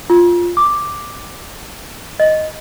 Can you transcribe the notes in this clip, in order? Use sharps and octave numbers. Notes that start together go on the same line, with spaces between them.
F4
D6
D#5